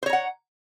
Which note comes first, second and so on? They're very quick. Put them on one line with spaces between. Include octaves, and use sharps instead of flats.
C5 C#5 A#5 F#5